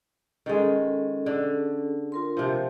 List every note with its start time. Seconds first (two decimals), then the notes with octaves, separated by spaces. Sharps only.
0.46 D#3 G#3 C#4 G#4 A4
1.26 D3
2.12 F4 A#4 C6
2.37 C3 F3